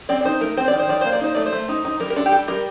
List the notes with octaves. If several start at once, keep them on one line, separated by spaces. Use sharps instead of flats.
C4 D5
D5
D#4 C5
A3 A#4
C4 C5
D#3 D5
C5
D#3 D5
A#3 C5
D5
D#4 C5
A3 D5
C5
A3
D#4
D#4
G3 A#4
A#4
D4 A4
G4
G3 A4
G3 A#4